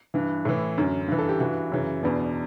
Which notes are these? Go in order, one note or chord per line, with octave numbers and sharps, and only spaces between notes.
G2 E3
A2 E3
F#2 D3
G2 E3
A4
G4
G2 E3 F#4
F#2 C#3 E3
E2 B2 D4